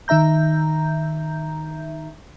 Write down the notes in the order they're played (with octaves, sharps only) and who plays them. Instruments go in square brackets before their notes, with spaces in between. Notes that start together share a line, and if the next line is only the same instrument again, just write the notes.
[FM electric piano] D#3 D#4 E5 A#5 G6